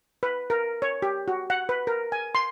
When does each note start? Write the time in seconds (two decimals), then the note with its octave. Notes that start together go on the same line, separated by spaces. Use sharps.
0.23 B4
0.50 A#4
0.82 C#5
1.02 G4
1.28 F#4
1.50 F#5
1.69 B4
1.87 A#4
2.12 G#5
2.35 C6